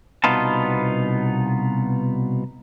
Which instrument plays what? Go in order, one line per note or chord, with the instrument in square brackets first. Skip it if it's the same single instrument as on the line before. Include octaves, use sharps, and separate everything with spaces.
[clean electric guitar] C2 B2 B3 D#4 F4 A5